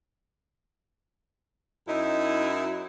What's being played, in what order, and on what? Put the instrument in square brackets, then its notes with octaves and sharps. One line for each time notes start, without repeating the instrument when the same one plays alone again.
[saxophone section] F#2 D#4 E4